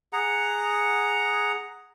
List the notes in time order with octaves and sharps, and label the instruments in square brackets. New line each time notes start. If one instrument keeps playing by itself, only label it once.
[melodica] G#4 F#5 A#5